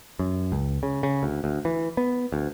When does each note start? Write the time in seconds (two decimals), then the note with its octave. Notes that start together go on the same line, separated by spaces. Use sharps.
0.19 F#2
0.52 C#2
0.83 C#3
1.03 C#3
1.23 D2
1.44 D2
1.65 E3
1.97 B3
2.32 D2